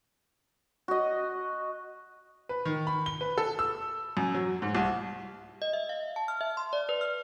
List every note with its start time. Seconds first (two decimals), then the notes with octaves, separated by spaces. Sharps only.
0.88 F#4 D#5
2.49 B4
2.65 D#3
2.87 B5
3.06 G7
3.21 B4
3.38 A4
3.59 E6
4.17 F#2
4.35 F#3
4.62 G#2
4.75 C2
5.62 D#5
5.73 E5
5.89 F5
6.16 A5
6.28 F6
6.41 E5
6.57 C6
6.73 D5
6.89 B4
7.01 F6